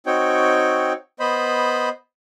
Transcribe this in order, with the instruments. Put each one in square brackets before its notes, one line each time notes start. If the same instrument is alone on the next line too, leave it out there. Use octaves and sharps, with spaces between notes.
[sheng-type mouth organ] C4 D#4 F#4 C#5 G5
B3 C5 D#5 B5